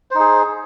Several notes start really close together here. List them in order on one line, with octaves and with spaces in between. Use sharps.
C5 D#4 G#4